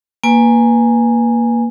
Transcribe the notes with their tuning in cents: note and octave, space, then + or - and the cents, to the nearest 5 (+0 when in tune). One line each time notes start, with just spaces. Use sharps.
A#3 +0 B4 +0 G#5 -5